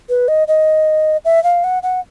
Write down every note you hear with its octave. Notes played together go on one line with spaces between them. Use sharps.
B4
D#5
D#5
E5
F5
F#5
F#5